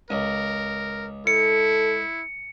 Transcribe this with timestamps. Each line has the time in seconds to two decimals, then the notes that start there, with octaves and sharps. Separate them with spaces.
0.10 C#2 A#4
1.27 E4 A4 C#7